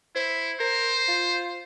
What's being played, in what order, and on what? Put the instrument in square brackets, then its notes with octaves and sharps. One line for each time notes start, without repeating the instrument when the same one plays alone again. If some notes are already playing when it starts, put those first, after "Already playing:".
[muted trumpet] E4 [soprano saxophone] C5
[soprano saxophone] A#4 [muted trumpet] C5
[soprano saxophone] F4